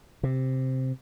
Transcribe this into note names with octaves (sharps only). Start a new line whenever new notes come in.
C3